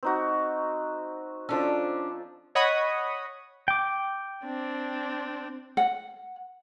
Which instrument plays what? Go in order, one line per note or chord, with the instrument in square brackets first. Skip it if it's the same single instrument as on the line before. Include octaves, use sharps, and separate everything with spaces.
[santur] C4 D#4 F#4
[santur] F3 A4 [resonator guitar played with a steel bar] C#4 D4
[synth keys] C#5 D#5 F#5 B5 C#6 D#6
[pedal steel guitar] G5 D6
[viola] C4 D4
[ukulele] F#5